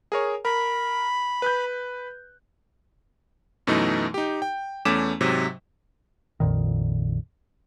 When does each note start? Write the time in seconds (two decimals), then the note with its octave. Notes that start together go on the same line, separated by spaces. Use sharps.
0.12 G#4 A#4 C#5
0.45 A#4 B5
1.42 B4 F#6 G6
3.67 F#2 B2 E3 A3 D#4
4.14 D#4 G4
4.42 G5
4.85 E2 A3 C#4 D6 B6 E7
5.21 G#2 C3 F#3
6.40 A#1 F2 A#2 D#3